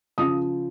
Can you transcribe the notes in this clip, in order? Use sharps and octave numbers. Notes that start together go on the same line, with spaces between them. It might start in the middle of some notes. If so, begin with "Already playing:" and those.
C#3 F3 D#6